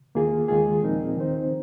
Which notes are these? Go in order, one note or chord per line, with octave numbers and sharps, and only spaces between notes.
D#2 D#3 A#3 F4 G#4
D#2 D#3 G#3 F4 G#4
A#2 F3 C4 D#4 A#4
D#2 D#3 C4 D#4 C5